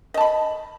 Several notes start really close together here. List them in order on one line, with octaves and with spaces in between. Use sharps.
D#5 A5 B5